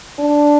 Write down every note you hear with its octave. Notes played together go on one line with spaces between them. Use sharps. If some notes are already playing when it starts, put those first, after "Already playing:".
D4